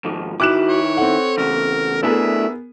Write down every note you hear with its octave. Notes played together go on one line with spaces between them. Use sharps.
G#2 D#3 F3
D#3 E4 F#4 D6 F#6 E7
C#5
C4 A4 F#5
E2 C#3 A#4
A3 B3 D4 E4 G#4 A#4 E5